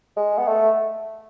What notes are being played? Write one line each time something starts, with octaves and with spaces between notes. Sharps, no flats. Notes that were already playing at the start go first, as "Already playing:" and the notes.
G#3
B3
A3